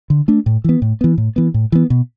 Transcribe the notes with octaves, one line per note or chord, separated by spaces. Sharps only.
D3
A3 D4
A2
E3 B3
A2
E3 B3
A2
E3 B3
A2
E3 B3
B2